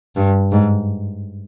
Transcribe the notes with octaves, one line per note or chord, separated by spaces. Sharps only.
G2
G#2